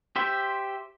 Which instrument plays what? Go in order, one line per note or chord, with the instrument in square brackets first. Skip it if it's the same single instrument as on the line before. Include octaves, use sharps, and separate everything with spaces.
[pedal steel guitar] G4 C5 E5